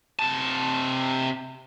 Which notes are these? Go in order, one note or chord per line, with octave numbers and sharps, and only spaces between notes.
C3 A5